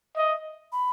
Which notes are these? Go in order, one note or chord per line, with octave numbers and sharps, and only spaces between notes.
D#5 E5
B5